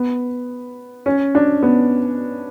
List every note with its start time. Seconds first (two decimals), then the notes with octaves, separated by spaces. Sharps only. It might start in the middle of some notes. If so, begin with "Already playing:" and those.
Already playing: B3
1.06 C#4
1.35 D4
1.63 B3